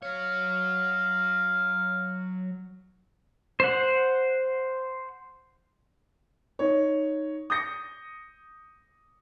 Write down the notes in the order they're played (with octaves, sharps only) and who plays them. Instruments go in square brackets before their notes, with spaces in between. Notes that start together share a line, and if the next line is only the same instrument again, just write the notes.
[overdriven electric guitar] F#3 C#5 [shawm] F5
[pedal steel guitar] C5 F#5
[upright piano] D#4 C#5
D#6 G6 A#6 C#7